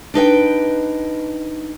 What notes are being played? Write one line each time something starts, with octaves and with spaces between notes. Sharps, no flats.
D4 D#4 B4 G5